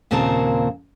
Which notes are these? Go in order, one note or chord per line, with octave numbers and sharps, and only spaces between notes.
D#2 A#2 C#3 C4 A#4 A5